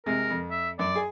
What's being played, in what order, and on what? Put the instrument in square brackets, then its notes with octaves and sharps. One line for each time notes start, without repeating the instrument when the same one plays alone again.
[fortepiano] C3 G#3 [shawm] A#4
[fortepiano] F2
[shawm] E5
[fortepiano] F#2 [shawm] D5
[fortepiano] G#4 G#5